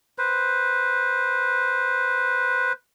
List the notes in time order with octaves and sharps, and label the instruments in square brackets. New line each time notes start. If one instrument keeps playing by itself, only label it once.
[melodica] B4 C5